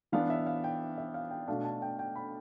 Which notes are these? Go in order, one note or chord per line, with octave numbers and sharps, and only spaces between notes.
E3 B3 D4 F5
E5
F5
G5
E5
F5
G5
B2 A3 D4 F5
A5
G5
G5
B5